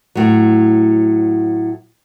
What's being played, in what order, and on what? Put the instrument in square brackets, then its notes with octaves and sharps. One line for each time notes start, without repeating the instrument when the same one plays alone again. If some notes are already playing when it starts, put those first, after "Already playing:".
[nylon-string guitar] A2 F#3